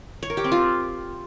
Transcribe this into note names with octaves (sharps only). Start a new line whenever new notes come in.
C#5
A#4
G4
C4
F4